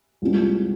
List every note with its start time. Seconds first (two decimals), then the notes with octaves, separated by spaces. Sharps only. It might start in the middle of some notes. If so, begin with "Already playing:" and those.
0.22 C2 A#2 G#3 C4